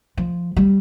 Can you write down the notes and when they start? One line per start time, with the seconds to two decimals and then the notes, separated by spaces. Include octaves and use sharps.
0.17 F3
0.56 G3